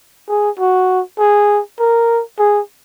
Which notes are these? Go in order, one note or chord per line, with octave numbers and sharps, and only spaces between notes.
G#4
F#4
G#4
A#4
G#4